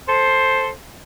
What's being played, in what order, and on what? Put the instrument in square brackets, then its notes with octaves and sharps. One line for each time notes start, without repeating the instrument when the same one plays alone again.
[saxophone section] A4 C5